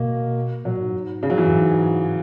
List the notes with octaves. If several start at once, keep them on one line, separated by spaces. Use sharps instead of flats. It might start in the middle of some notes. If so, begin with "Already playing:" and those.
Already playing: B2 A#3
A#2 F#3
G#2
G#2
C#3
F#3
E3
F#2
G#2